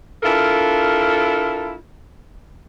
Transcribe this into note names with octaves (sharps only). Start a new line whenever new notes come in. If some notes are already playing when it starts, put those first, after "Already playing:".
D4 E4 F4 A4 A#4